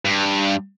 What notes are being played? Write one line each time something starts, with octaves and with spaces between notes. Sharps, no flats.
G2